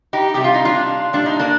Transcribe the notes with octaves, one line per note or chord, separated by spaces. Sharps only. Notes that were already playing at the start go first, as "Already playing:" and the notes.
D#4 G4
C3 G3 G4
F4
D#4
D4 F4
A#2 G3 D4
D#4
A#3 D4